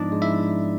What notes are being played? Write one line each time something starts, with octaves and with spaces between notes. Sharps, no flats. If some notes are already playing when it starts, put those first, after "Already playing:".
Already playing: G#2 F3 G#3 B3 D4 D#4 D5 D#5
G#3
E4 E5